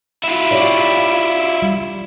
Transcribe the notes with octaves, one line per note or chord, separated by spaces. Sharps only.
E4 F4
G4 C#5 D5
G3